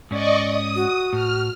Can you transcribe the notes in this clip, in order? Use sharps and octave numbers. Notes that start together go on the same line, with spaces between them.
G#2 C#4 D5 D#5 C#6
D#6
F#4
A2 F6